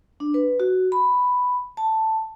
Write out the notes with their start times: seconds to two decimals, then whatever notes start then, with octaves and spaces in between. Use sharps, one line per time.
0.20 D4
0.34 B4
0.60 F#4
0.92 B5
1.77 A5